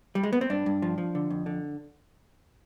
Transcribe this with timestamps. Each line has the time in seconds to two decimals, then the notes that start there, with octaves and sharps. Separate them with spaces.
0.15 G3
0.23 G#3
0.33 B3
0.41 C4
0.50 G2 D4
0.66 G2
0.82 F3
0.98 F3
1.15 D3
1.30 F2
1.46 D3